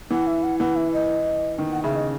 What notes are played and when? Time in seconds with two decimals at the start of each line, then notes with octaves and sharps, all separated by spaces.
0.10 E3 F#5
0.27 E5
0.43 F#5
0.60 E3 F#5
0.76 E5
0.93 D#5
1.58 D#3
1.72 F#5
1.83 C#3 E5
1.96 D#5